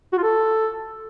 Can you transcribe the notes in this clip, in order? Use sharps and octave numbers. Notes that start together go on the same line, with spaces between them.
F#4
F4
A4